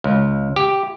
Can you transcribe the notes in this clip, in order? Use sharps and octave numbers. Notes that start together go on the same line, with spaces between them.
C#2
G4